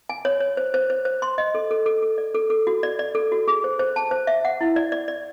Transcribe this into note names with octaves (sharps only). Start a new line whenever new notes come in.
G#5
C#5
C#5
C5
C5
C5
C5
C6
D#5
A4
A4
A4
A4
D5
A4
A4
F#4
D5
D5
A4
F#4
G#4
C5
C5
A5
C5
E5
F#5
E4
D5
D5
D5